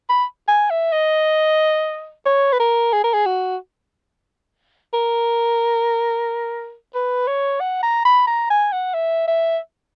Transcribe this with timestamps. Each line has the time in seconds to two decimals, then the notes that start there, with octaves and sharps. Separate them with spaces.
0.09 B5
0.48 G#5
0.70 E5
0.92 D#5
2.26 C#5
2.53 B4
2.60 A#4
2.93 G#4
3.04 A#4
3.14 G#4
3.26 F#4
4.94 A#4
6.95 B4
7.27 C#5
7.60 F#5
7.83 A#5
8.05 B5
8.27 A#5
8.50 G#5
8.72 F#5
8.94 E5
9.28 E5